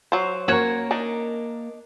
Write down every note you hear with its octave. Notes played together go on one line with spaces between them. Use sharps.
F#3 C5
A#3 C#4 F#4 A#4 C#5
D4 D#4